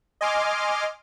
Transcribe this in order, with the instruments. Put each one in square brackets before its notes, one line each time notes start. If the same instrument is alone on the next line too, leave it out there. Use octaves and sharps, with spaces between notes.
[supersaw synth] D#5 G#5 C6 D6 F6